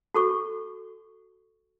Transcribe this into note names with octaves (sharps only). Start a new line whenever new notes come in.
F#4 A4 C#6